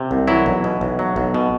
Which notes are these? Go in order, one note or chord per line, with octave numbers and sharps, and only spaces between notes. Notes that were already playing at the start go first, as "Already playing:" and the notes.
Already playing: C3
C2
E3 F#3 E4
B1
B2
B1
F#3
B1
B2